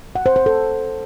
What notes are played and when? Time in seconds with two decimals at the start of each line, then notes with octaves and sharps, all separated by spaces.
0.15 F#5
0.26 C5
0.36 C5
0.46 A4